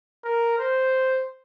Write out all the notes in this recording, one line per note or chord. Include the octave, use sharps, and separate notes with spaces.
A#4
C5